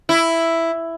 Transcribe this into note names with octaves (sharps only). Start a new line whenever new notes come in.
E4